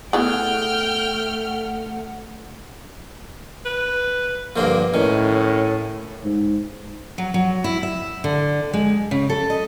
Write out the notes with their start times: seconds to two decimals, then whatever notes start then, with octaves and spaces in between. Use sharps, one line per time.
0.13 A3 B3 E4 G#4 F#5 G5 F6
3.65 B4
4.56 G2 D3 F3 A#3
4.94 A2 D#3 C#4
6.24 G#2
7.18 F#3
7.34 F#3
7.64 E4
7.83 E5
8.24 D3
8.73 G#3
9.11 C#3
9.30 A4
9.50 D#5